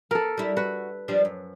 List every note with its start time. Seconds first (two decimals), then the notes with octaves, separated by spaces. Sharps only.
0.11 B3 A4 A#4
0.37 G3 E4
0.57 F#4 B4
1.08 F3 G3 D4
1.25 F#2